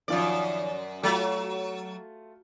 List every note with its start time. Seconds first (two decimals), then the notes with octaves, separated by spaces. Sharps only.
0.08 F#2 D#3 F3 F4 D5
1.03 F#3 A3 F4